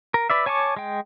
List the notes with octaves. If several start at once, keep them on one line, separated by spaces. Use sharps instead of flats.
A#4
B4 D5 E5
C#5 G#5 A5 C#6 D6
G#3 G5